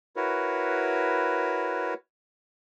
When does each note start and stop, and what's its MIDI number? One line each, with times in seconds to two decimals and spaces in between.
0.16 1.94 64
0.16 1.94 66
0.16 1.94 70
0.16 1.94 71
0.16 1.94 73